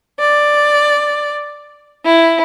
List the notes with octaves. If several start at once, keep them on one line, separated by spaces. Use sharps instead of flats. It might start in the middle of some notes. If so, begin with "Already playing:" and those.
D5
E4